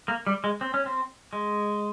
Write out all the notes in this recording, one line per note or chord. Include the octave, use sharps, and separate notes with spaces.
A#3
G3
G#3
C4
C#4
C4
G#3